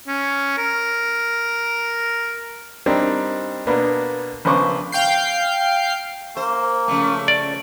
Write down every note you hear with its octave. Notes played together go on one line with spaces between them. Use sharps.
C#4
A#4
G3 C4 D4 D#4 A#4
B2 A#3 B3 D4
A#1 C#3 B3 C5 C#6 D6
F5 G5 G6 C7
A#3 C5
C#3 F3 A3
D5